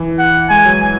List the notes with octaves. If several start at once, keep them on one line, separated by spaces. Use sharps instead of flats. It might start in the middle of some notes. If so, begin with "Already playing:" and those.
Already playing: E3
F#5
G#3 G#5
F#3